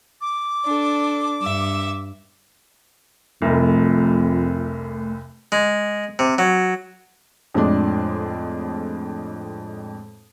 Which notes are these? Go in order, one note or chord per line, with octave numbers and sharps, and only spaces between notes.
D6
D4 A4
G2 E5 E6
F1 C2 F2 A3
G#3
C3
F#3
F2 A2 G#3 D4